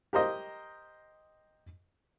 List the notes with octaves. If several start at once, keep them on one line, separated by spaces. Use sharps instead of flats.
G4 A#4 C5 D#5